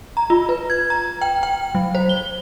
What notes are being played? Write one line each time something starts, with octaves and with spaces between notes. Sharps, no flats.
A#5
F4
B4
G#6
A#5
G5
G5
F#3
C5
G7